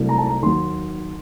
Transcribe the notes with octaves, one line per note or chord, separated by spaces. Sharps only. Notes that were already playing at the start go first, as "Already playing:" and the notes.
Already playing: C2 C3 F#3 A3
A#5
A5
A#5
D#2 D#3 F#3 C6